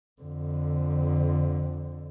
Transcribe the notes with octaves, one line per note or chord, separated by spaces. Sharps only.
F2 D3